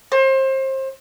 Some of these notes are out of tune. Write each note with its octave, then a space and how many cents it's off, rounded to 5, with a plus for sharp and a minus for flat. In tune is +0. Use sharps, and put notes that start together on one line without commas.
C5 +30